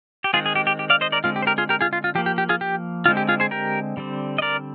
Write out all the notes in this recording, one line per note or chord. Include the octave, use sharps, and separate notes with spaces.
G4
D#3 G#3 C4 F4 G#4
G#4
G4
G4
G4
D5 F5
C5 D#5
A#4 D5
D3 G#3 C4 F4
G4
C5
G4 A#4
F4 G#4
G4 A#4
F4 G#4
F4
F4
F3 A#3 G4
G4
G4
F4 G#4
G4
D3 G#3 C4 F4
G4
F4 G#4
G#4 C5
G4 A#4
D3 G3 C4
D#5
A#4 D5